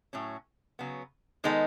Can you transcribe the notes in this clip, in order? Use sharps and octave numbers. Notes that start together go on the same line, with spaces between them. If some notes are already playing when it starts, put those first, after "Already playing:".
A2 F#3 C#4
C#3 F#3 B3
D#3 G#3 B3 D#4 A4